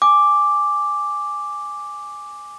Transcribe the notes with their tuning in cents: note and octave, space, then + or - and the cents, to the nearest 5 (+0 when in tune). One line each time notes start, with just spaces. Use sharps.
G#5 +0 D6 +0